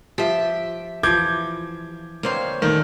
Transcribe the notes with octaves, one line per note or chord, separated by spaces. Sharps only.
F3 G4 E5
E3 F3 D6 G6 G#6
D2 A#3 C4 C5 C#5 F5
A#2 D#3 A3 C#4